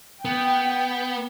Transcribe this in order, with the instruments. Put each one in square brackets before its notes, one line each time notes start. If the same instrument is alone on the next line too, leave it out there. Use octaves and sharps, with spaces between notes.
[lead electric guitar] B3 [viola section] G5